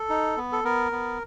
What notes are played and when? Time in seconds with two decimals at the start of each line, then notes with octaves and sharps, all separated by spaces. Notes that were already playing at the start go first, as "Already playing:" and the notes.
Already playing: A4
0.09 D#4
0.37 B3
0.52 A4
0.64 B3 A#4
0.92 B3